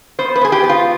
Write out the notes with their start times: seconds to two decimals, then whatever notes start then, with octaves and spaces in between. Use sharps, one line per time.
0.19 B3 C5
0.35 B4
0.41 B3 G#4
0.52 G4
0.64 B3
0.69 F4